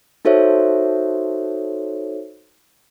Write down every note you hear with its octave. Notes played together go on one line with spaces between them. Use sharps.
D#4 F#4 A4 C5 C#5 E5